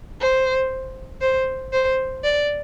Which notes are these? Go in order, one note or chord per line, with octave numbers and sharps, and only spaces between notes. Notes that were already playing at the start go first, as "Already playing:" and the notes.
C5
C5
C5
D5